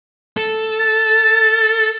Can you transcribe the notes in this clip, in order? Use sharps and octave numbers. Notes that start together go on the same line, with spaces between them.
A4
A6